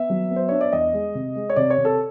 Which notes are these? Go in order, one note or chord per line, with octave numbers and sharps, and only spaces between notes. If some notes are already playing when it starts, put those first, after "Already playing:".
Already playing: B3 E5
F#3
B3
C5
D4 C#5
D5
E2 D#5
G#3
C3
G#3
C#5
C3 D5
C#5
C3
A4